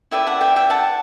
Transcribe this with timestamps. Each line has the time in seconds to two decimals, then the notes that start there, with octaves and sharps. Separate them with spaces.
0.11 E4 B4 D5 E5 G5
0.26 F#5 A5
0.41 E5 G5
0.56 E5 G5
0.70 F#5 A5